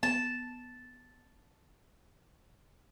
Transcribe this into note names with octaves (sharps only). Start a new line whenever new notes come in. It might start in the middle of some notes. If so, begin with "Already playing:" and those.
B3 A5